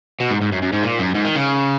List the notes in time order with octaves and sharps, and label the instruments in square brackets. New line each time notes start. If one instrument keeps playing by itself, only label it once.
[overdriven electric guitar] B2
G#2
G#2
F#2
F#2
G#2
A#2
F#2
G#2
D#3
C#3